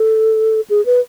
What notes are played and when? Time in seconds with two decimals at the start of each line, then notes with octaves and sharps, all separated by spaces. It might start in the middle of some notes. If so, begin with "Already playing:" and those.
Already playing: A4
0.70 G#4
0.86 B4